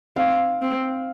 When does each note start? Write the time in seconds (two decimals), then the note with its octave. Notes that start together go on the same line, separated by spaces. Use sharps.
0.16 C4 F5
0.62 C4